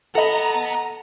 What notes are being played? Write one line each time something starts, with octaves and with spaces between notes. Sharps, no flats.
A4 D#5 F#5 A#5 B5